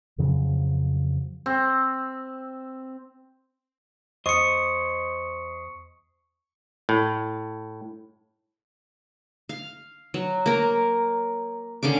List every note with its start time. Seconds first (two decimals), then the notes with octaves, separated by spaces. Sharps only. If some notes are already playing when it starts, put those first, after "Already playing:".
0.18 F2 C#3 F3 F#3
1.46 C4
4.26 E2 C5 D#5 C#6 D#6 C#7
6.89 A2
9.49 F5
10.14 F#3
10.46 A#3 A#4
11.83 D3 C#4 F5 D6